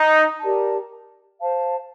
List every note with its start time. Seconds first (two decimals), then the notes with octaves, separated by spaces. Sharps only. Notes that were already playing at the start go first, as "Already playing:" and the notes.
Already playing: D#4
0.41 G4 A#4 D5 A5
1.40 C5 F5 A5